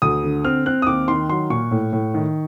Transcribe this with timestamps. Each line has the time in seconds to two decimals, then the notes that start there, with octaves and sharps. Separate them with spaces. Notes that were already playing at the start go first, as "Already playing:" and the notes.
0.02 D2 D#6
0.23 D3
0.45 C4 F6
0.66 C4 F#6
0.82 D#6
0.87 D#2 D6
1.08 D#3 C6
1.29 F#3 C6
1.50 A#2 C#6
1.71 A2
1.93 A2
2.14 D#3